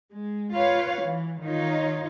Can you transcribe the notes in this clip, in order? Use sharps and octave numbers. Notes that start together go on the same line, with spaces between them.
G#3
F4 B4 C#5 F5
E3
D#3 D#4 F4 C#5